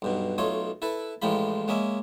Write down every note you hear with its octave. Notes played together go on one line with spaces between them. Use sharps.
B1 G2 B2
B1 A3 F4 C#5 D#5
E4 A4 B4
A1 A2 F3 G#3 F4 B5
G#3 A#3 C#4 D#5 E5